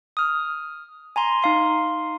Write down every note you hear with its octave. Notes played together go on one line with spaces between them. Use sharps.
D#6 F6
G#5 A#5 C6
D#4 F5 C6